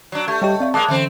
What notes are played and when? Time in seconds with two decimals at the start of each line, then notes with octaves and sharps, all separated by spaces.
0.12 F#3 D4
0.28 A3 G4 C#6 G#6
0.42 G3 G4 C#5 D#5 G5
0.60 C4 D5 F5 C#6
0.74 G#3 A#3 A5 D6 F#6
0.88 D3 E3 A3 C4 C#4